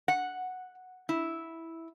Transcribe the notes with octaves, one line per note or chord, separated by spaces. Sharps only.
F#5
E4